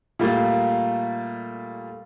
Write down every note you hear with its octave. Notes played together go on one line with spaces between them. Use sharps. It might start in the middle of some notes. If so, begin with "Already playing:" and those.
A#2 G3 A3 A#3